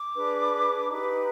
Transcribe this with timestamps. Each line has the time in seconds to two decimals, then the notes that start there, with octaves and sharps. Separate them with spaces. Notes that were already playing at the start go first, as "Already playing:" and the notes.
Already playing: D6
0.16 D4 G#4 B4
0.89 D#4 G4 B4